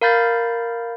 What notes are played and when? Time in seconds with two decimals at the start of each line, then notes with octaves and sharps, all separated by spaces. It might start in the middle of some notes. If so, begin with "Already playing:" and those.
0.01 A#4 F5 B5 G6 A6